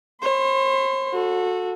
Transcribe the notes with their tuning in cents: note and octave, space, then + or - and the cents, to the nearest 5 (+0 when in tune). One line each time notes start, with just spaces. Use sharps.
C5 +45 C6 -40
F#4 -25 A4 +0